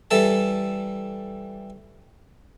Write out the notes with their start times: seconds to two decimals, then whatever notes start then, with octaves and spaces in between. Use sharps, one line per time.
0.11 E3 G3 A4 A5